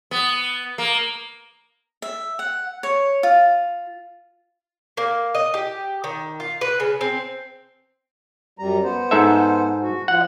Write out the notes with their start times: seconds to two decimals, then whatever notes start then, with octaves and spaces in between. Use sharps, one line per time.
0.11 B3
0.78 A#3
2.02 E5
2.39 F#5
2.83 C#5
3.23 F4
4.97 A#3
5.35 D#5
5.54 G4
6.04 D#3
6.40 F4
6.61 B4
6.80 C#3
7.01 C4
8.59 F#2 G3 A#5
8.84 B3 C5
9.11 G#2 A4 E5
9.83 F#4
10.08 F3 F#5